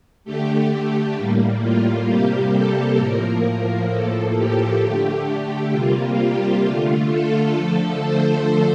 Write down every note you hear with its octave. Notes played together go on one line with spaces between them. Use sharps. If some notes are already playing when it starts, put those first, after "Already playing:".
D3 A3 G4
G4
A2 G3 A#3
F4
C3 G3 A#3 G4
A4
A2 F3 A#3 A#4
A#4
A2 F3 A#3 A4
G4
D3 A3
C3 G3 A#3 F4
G4
D3 A3 F4
A4
D3 F3 A3 A4
C5